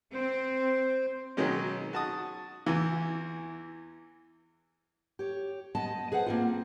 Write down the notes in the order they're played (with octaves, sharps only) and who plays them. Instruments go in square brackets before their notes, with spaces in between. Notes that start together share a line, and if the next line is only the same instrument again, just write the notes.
[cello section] C4 [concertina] C5
[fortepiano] B2 D#3 F#3 G#3 C#4
F#4 A5 D#6
E2 E3
[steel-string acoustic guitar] G4 C#5
G#3 B3 D#5 A5
G#4 B4 C5 F#5
A#3 C4 F4